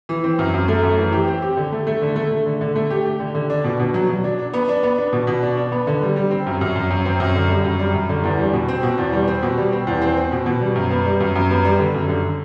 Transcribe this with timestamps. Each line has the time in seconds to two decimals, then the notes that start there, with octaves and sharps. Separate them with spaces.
0.09 E3
0.24 C4
0.39 F#2
0.54 F#2
0.68 A3
0.83 F#2
0.98 E3
1.12 G4
1.28 C4
1.42 G4
1.57 D3
1.72 A3
1.87 A3
2.02 D3
2.16 A3
2.31 A3
2.46 D3
2.61 D3
2.75 A3
2.90 G4
3.06 G4
3.20 D3
3.34 D3
3.50 D4
3.64 B2
3.79 B2
3.94 F#3
4.09 F#3
4.24 D4
4.38 D4
4.53 B3
4.68 D4
4.83 B3
4.98 D4
5.13 B2
5.27 B2
5.42 D4
5.57 D4
5.72 B3
5.87 D3
6.02 G3
6.16 G3
6.31 C4
6.46 F#2
6.61 F#2
6.75 F#2
6.90 F#2
7.05 C4
7.20 F#2
7.35 D3
7.50 G3
7.65 F#2
7.79 G3
7.94 F#2
8.09 D3
8.24 E2
8.39 G3
8.53 B2
8.68 C4
8.83 B2
8.98 E2
9.13 G3
9.27 C4
9.43 B2
9.58 G3
9.72 C4
9.87 E2
10.01 C4
10.17 C4
10.32 B2
10.46 B2
10.61 G3
10.75 F#2
10.91 B3
11.05 G3
11.20 F#2
11.35 F#2
11.50 B3
11.65 G3
11.79 D3
11.94 F#2
12.09 D3